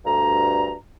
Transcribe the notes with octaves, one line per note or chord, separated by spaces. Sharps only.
D2 G2 A#5